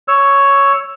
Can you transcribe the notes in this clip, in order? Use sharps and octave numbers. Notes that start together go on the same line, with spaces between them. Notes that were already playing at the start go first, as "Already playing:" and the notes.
C#5 E6